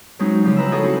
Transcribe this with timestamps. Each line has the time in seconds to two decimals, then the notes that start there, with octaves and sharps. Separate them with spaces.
0.19 F#3 G#3 C4 C#4 D#4
0.43 C#3 F3 G3
0.57 E4 B4 D#5 A#5 B5 E6
0.71 E4 F#4 G#4 A4 C#5 D#5
0.83 C4 C#6